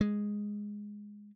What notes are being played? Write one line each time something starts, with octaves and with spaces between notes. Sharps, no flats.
G#3